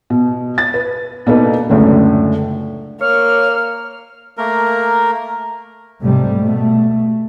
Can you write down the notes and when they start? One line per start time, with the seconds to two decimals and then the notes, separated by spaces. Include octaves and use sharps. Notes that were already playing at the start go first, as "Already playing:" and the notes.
0.10 B2
0.58 A6
0.74 B4
1.27 B2 A#3 D4 D#4 A4 B4
1.69 C#2 F#2 A2 D3
3.01 A#3 C#5 F6
4.37 A3 A#3 A#4
6.01 G#2 C3 G3 A3
6.39 B2 A3